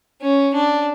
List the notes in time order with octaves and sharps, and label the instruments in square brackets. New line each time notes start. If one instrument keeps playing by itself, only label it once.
[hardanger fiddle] C#4
D4